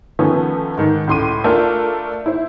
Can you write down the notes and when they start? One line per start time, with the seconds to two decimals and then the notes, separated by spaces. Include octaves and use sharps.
0.19 D#3 F3 A3 B3 C#4
0.77 G#2 D#3
1.07 C#2 A2 C6 D6 D#7
1.44 A3 D4 F4 A#4 D5 F5
2.26 E4 C5